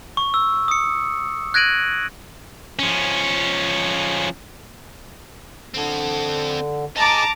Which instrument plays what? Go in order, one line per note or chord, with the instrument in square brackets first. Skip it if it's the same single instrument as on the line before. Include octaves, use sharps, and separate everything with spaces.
[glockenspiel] C#6
E6
D#6 C#7
F#6 G#6 A#6 D7 D#7 F#7
[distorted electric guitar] F3 C#4
[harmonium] D3 [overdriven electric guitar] C4 A4
[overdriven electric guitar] D#4 G#4 [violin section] A5 A#5 D6